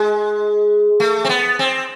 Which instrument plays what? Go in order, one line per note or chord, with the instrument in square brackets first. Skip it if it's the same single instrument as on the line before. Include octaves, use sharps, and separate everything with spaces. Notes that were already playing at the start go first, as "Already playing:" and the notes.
Already playing: [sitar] G#3
A3
C4
B3
C4